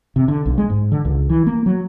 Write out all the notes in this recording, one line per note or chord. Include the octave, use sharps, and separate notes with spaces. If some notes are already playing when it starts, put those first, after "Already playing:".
C3
D3
B1
G#3
G#2
D3
C#2
E3
A#3
F#3